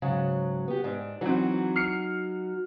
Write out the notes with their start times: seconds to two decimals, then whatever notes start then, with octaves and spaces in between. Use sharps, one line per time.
0.02 G#2 C#3 F#3
0.68 B3 G4
0.84 G#2 D4
1.21 E3 F#3 C4 D#4 F#4
1.76 F6 C7 C#7